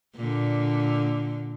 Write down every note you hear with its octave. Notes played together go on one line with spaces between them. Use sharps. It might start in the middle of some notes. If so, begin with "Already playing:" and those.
A#2 D3